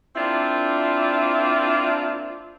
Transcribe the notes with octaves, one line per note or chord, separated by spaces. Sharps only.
A#3 C4 D4 E4 F4